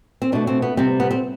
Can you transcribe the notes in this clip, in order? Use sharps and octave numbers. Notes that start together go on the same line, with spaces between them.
C4
B2 A3 D4
C4
B3
C3 G3 C4
B3
C4